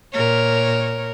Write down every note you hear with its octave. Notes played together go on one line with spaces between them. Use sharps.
A#2 A#4 C#5